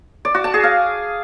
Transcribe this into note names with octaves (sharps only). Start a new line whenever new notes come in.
D5
F#4
A5
G#4
F5